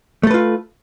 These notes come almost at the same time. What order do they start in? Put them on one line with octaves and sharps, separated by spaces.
A3 A4 B4 F4